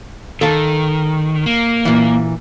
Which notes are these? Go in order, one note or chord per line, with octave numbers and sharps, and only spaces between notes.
D#3 A4 F5 A5
A#3
A#2 E3